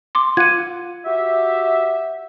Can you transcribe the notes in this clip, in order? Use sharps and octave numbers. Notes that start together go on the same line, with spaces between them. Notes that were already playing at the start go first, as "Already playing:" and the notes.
C6 D6
F4 F#5 G#6 D#7
F#4 G4 E5